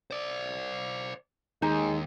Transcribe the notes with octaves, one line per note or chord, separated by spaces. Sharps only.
C5 D5
D#2 G#3 D#4 C5 G#5